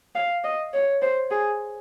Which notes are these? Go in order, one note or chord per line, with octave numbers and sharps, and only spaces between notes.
F5
D#5
C#5
C5
G#4